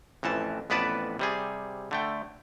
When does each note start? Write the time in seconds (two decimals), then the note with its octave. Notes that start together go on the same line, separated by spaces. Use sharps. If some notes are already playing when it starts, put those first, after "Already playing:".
0.23 A1 F2 E3 A5
0.70 A1 F2 B3 B4 D5 A5
1.19 C3 G3 G#4
1.91 D3 A3 G5